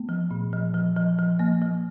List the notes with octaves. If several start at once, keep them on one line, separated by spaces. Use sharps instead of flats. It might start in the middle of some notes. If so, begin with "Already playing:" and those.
Already playing: A3 B3
F3
A#2
F3
F3
F3
F3
F3 A#3
F3